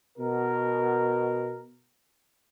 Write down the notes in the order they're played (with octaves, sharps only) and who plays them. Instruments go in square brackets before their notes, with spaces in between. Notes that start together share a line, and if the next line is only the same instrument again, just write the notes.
[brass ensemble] B2 A#4